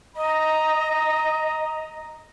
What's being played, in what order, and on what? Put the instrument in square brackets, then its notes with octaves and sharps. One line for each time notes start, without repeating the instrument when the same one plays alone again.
[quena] D#5 [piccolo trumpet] A#5